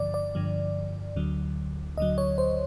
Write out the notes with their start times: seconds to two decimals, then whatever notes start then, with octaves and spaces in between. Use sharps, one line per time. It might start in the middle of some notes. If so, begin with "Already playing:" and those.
Already playing: G2 D3 F3 D5
0.14 D5
0.35 G2 D3 F3
1.16 D2 D3 F#3
1.97 D2 D#5
2.00 D3 F#3
2.18 C#5
2.38 C5